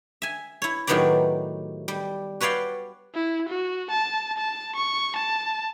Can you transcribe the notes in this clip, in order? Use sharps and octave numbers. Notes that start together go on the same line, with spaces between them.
E5 G#5
E4 C#5
A2 D#3 F#3 B3 G4 D5
G3
F#4 B4 C#5 D5 F5 G5
E4
F#4
A5
A5
C#6
A5